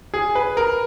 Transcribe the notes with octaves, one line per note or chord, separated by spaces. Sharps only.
G#4
B4
A#4